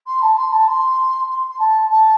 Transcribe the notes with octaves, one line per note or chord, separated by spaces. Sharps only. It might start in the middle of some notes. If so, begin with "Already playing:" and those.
C6
A5
C6
A5
C6
C6
C6
A5
A5